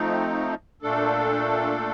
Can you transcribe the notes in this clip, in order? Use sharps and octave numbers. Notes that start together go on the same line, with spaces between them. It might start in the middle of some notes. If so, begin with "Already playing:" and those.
Already playing: F3 A3 C4 D#4
A#2 A3 D4 A4